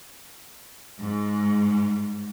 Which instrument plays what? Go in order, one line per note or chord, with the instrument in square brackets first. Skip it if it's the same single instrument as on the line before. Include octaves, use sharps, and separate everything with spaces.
[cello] G#2 G#3